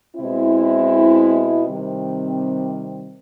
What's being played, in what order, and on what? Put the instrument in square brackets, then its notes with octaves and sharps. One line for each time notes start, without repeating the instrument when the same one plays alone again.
[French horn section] B2 G#3 C4 E4
C3 D#3 G3 C4